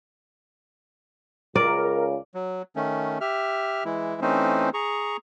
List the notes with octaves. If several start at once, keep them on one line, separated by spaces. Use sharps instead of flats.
C#2 C#3 A#4 D5
F#3
D#3 A3 C#4
G4 E5 F6
E3 G#3 E4
E3 A3 C4 C#4 D#4 C5
G#4 A#5 C#6